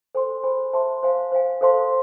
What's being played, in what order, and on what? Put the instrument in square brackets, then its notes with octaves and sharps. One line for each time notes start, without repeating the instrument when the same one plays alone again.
[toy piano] A4 C5 G#5 C6
G#4 C5 G#5 B5
C5 E5 A5 C6
C5 F5 G#5
C5 F5 G#5
A4 C5 F5 A5 C6